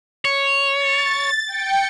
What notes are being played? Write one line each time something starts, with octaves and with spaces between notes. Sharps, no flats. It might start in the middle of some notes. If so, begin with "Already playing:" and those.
C#5
A6
G5 C#7